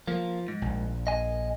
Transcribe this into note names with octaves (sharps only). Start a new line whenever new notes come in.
F3 A#3
G#2
A#1
D#5 G#5